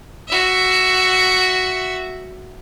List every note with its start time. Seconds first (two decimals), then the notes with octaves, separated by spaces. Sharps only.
0.29 F#4 E5